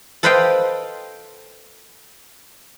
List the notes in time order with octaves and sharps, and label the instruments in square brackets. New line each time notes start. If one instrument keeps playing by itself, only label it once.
[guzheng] A4 B4 C5 D#5 F5 G5